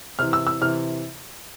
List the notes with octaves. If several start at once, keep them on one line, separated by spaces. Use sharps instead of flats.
C3 E3 F6
E6
E6
C3 E3 F6